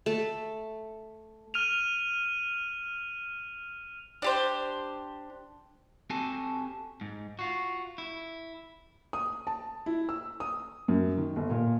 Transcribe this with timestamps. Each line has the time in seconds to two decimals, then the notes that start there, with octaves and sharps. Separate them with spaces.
0.06 A3
1.54 F6 D#7 F7
4.22 D4 G4 C5
6.10 C4 F#4 G4 A4 G#5 A5
7.01 G#2
7.39 F4 F#4
7.98 E4
9.13 D#6
9.47 A5
9.86 E4
10.09 E6
10.40 D#6
10.88 F#2
11.17 D#3
11.36 G1
11.50 A#2